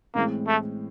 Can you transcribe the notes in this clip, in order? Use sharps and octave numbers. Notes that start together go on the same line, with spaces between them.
A2 E3 G#3 A#3 C4
A3